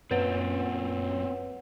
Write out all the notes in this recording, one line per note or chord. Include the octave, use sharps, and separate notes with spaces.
F#2 A#2 C4 C#4 B4 C#5 F#5